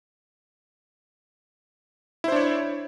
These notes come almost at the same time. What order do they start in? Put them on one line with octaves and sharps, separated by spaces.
E4 C5 D4 C#5